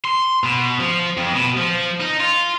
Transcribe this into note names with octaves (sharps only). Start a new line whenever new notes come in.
C6
B2
F3
F2
B2
F3
D#4
F4